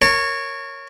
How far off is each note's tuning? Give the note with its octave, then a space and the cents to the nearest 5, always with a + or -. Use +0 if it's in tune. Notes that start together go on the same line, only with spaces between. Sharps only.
A#4 +0 C#5 -5 A#5 -45